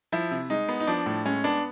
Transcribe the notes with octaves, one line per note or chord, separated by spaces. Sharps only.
F3 E4
C3
G#3 D#4
B3
D#4
F3 D4
A2
G#3 C#4
B3 D4